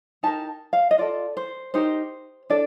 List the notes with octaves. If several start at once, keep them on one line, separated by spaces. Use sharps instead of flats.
D#4 G4 A#4 A5
F5
D#5
F4 A4 D5
C5
D#4 G4 A#4 C5
D4 A4 D5